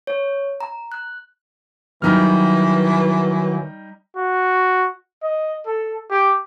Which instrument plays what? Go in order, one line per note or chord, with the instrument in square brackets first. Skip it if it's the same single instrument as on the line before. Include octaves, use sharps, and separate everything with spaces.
[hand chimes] C#5
A#5
F#6
[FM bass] D#3 [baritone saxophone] E3 [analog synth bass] F#3 [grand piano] G3 D#4 F6
[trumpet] F#4
D#5
A4
G4